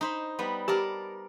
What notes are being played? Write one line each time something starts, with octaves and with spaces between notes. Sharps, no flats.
D#4 C5 B5
G3 B3
G4 A#4 D5 A5